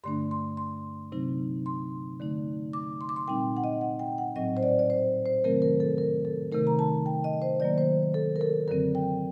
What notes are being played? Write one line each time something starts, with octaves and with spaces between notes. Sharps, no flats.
G2 D3 A3 D4 C6
C6
C6
C3 F#3 C4 D#4
C6
D3 A3 D#4
D6
C6
D6
C6
A#2 G3 C4 D#4 G5
F#5
D#5
F#5
G5
F#5
A2 F#3 C4 D#5
C5
D5
D5
C5
C5
C3 D#3 F#3 A3 C4 A#4
A#4
A4
A#4
A4
C3 D#3 A3 D#4 A#4
A#5
A5
G5
D#5
C5
D#3 F#3 A#3 D5
C5
A4
A#4
A4
F#2 D3 F#3 C4 A#4
G5